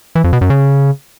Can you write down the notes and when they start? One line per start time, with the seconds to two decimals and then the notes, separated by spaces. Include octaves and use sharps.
0.15 E3
0.24 F2
0.33 B2
0.41 F#2
0.50 C#3